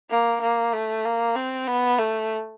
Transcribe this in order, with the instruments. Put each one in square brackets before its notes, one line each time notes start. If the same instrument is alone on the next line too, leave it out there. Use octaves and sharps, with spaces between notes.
[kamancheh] A#3
A#3
A3
A#3
C4
B3
A3